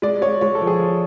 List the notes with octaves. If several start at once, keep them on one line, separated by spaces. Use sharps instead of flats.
G#3 D5
G#3 C#5
G#3 C#5
A4
F3
G#4
F3